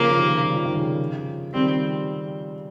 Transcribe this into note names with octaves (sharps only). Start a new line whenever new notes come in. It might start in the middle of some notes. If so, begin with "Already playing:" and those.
Already playing: C#3 F3 A#3
F3
C3 D#3
G3
F3
D#3
C#3 F3
D#3 G3 C4